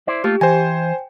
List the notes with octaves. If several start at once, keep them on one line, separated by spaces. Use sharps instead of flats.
E4 C5 D5
A3 A#3 F4 G4
E3 C5 G5 G#5